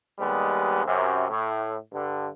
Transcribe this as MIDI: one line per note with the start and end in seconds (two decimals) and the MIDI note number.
0.19 0.84 39
0.19 0.84 55
0.19 0.84 56
0.19 0.84 59
0.85 1.26 42
0.85 1.26 48
1.30 1.76 45
1.92 2.29 43
1.92 2.29 50